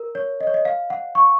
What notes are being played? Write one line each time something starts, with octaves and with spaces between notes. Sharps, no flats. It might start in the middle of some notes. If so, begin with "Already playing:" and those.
Already playing: A#4
C#5
D#5
C#5
D#5
F5
F#5
C#6